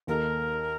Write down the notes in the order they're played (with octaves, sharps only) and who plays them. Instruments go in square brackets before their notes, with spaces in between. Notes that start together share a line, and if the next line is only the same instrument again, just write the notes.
[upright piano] D#2 D#3 A#3 D#4 A4 [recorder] A#4